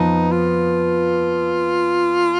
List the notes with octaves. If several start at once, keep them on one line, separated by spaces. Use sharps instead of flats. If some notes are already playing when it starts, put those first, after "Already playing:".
Already playing: F2 F3 B3 D#4
F4